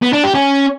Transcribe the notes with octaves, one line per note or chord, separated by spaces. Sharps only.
B3
D4
G4
C#4